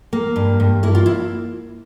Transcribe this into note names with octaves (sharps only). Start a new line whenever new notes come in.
A#3
G2
G2
A#3 E4
F4
E4